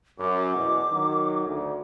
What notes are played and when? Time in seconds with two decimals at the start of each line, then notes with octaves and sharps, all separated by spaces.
0.19 F#2 D6
0.56 E2 B2
0.91 D#3 F#3
1.47 D2